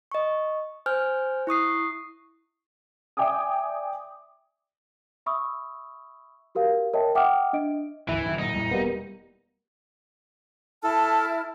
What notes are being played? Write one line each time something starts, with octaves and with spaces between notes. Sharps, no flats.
D#5 C#6
C5 G#5 F6 G6
E4 C#6 D#6 C7
D5 E5 G5 G#5 D6 D#6
E5 B5 C#6 D#6 E6
F#4 G4 A#4 F5
A#4 C#5 D#5 E5 G5 A5
E5 F#5 G5 D6 D#6 F6
D4 D#5 D7
G#1 D2 E3 E4
A1 F#2 D#3
A#2 F#3 D#4
F2 A#2 G3
E1 G3 A#3 B3
E4 A4 A5 F6